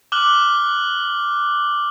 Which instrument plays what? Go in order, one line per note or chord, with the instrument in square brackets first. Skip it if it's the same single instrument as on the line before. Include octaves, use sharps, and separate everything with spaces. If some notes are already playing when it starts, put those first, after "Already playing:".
[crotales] D6 F6 F#6 F#7 G7